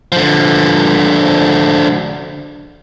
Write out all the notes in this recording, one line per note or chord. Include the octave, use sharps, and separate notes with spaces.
D3 F3